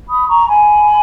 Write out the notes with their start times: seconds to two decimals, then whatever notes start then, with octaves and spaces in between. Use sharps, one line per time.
0.09 B5 D#6
0.29 A#5 C#6
0.48 G#5 B5